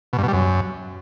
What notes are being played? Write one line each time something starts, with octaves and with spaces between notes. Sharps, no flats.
B2
G2
B2
G3
F#2